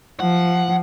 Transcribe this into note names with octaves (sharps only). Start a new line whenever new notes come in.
F3 F#5